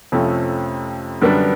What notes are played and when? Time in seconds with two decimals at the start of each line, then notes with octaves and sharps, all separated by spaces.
0.12 F2 C3 F3 A3 C#4
1.22 F#2 D3 G3 B3 D4